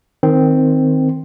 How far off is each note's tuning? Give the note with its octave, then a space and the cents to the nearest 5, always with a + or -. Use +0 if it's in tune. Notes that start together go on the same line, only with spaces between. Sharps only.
D#3 +0 C4 -5